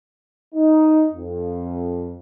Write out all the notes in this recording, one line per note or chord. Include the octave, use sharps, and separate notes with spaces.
D#4
F2